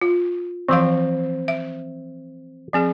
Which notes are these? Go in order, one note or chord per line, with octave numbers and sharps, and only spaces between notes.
F4
E3 F3 C4 F5
E5
F3 C4 G#4